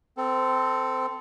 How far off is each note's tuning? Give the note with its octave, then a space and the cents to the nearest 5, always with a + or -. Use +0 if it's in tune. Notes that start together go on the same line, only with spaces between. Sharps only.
C4 -15 A4 +5